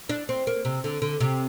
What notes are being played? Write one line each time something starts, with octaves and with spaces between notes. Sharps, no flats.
D4
C4
A#3
C3
D3
D3
C3